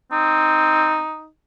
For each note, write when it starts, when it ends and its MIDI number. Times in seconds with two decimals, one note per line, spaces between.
0.12 0.99 60
0.12 1.28 63